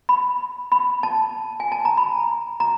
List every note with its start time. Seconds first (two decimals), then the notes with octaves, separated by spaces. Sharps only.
0.09 B5
0.72 B5
1.03 A5
1.60 G#5
1.72 A5
1.85 A#5
1.97 B5
2.60 A#5